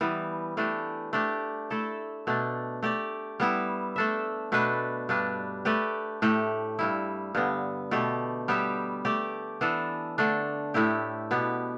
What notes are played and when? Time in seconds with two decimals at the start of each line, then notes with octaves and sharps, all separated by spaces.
0.01 E3 G3 B3
0.57 E3 A3 D4 G4
1.13 A3 D4 G4
1.70 A3 E4 A4
2.27 B2 A3 D4
2.83 A3 G4 D5
3.40 G3 B3 E4
3.96 A3 D4 A4 E5
4.52 B2 A3 D4 B4
5.09 G2 G3 D4 B4
5.65 A3 G4 B4 D5
6.22 A2 A3 G4
6.79 G2 G3 E4
7.35 G2 D3 B3
7.91 B2 A3 G4
8.48 G3 B3 G4 E5
9.05 A3 G4 D5
9.61 E3 B3 D4 A4
10.18 D3 A3 D4
10.74 A2 A3 E4 G4
11.31 B2 B3 G4